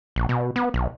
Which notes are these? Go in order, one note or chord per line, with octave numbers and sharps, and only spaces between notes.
A#1
B2
B3
B1